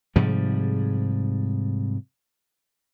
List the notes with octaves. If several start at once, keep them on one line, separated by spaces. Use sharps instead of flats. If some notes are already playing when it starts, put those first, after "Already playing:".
G#2 C3 F3 G3